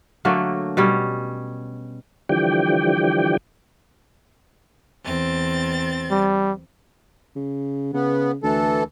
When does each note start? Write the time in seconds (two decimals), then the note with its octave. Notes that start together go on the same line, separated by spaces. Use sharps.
0.25 D3 F#3 A3 A#3
0.77 B2 G3 C#4
2.29 D3 E3 F3 G3 G4 G5
5.04 E2 C4 A6
6.11 G3
7.36 C#3
7.94 C#3 B3
8.43 D2 E3 A4